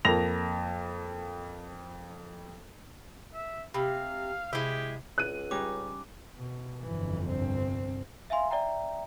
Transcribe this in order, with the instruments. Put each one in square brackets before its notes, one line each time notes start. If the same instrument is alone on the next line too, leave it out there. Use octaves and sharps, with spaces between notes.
[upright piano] F2 A#3 A#6 F7
[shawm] E5
[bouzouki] C3 [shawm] F5 [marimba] B5
[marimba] C3 [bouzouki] G#3 E4 [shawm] G4
[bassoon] C#2 [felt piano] F#6 D#7
[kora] G3 C#4 D#4 [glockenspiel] D6
[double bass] B2
[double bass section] G1 F2 [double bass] E3
[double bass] C2 C4
[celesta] E5 F5 G#5 C6
D5 E5 G5 A#5